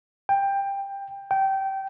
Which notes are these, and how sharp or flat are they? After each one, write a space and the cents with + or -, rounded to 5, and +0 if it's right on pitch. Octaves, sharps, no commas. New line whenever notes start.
G5 +15
G5 -20